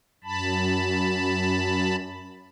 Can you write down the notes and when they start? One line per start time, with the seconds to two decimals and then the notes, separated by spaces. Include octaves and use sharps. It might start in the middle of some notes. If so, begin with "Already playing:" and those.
0.24 F#2 A5 B5